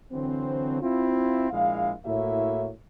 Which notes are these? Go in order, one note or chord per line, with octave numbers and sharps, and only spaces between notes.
D3 E3 F#3 C4
C4 E4 F4
A#1 G#3 E4 F5
A2 A#3 E4 F#4 C#5 E5